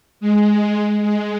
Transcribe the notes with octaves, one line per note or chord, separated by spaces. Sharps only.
G#3
G#3